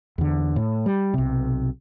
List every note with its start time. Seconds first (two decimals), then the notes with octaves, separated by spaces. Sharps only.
0.18 E2 D3
0.56 A2
0.86 G3
1.14 B1 C3